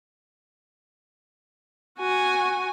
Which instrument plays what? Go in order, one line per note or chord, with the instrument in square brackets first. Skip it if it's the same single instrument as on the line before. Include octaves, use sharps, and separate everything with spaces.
[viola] F#4 G#5